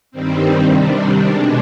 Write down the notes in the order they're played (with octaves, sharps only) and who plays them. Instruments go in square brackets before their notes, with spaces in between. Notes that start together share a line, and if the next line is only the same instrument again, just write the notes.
[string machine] G2 D#3 G3 C4
C4
C3 D#3 G3 D4
B2 G#3